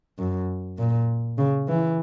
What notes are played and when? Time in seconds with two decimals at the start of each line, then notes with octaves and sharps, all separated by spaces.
0.19 F#2
0.78 A#2
1.38 C#3
1.68 E3